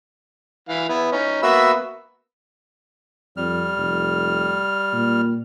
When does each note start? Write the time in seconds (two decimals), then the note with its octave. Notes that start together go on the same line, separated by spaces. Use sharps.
0.69 E3 F5
0.89 B3 E4
1.12 C#4 D#4
1.43 A#3 B3 F#4 E5 B5 E6
3.37 F2 G3 F6
3.77 F1
4.93 A#2